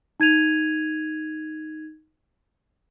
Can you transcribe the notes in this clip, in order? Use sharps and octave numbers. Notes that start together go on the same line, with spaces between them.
D#4 G#6 D#7 F7